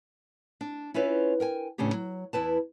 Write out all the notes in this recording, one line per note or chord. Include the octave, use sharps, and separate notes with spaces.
D4
C#4 E4 F4 B4 C#5
A#4 G5 G#5
E2 A2 C#3 C#4 D4 G4
F#3
E2 E4 B4 A5